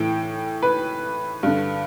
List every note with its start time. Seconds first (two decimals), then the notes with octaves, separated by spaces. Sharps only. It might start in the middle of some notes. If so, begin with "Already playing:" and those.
Already playing: A2 E3 G5
0.63 B4
1.43 G2 D3